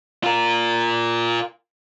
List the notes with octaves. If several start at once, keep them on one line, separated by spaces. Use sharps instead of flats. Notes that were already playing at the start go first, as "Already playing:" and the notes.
F4 A#4